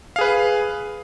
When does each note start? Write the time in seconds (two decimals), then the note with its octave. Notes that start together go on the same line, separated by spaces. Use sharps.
0.16 F5
0.19 G#4
0.21 B4